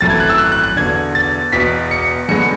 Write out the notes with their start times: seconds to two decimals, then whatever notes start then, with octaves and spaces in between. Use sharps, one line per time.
0.01 G#1 F#2 E3 A3 E4 A6
0.10 G#6
0.20 F#6
0.30 E6
0.38 F#6
0.52 F#6
0.64 F#6
0.77 E1 E2 D3 G#6
1.15 A6
1.52 E1 E2 B2 B6
1.91 C#7
2.29 F#2 D3 G#3 B3 C#7